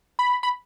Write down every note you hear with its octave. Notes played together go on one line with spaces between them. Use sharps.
B5
B5